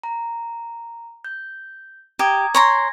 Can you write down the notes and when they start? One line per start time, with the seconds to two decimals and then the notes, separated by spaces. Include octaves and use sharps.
0.03 A#5
1.25 G6
2.19 G4 A#5 D#6 G#6
2.55 C#5 G#5 A#5 C6 G#6 A#6